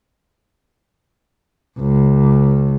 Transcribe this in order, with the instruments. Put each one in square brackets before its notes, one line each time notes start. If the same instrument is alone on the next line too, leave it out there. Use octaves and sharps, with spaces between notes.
[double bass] C#2